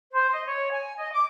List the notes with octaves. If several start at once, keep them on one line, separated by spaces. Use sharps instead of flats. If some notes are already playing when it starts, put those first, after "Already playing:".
C5
D#5
C#5
G#5
D#5
D6